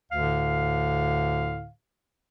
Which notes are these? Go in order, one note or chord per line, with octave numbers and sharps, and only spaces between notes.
D2 A2 D3 F5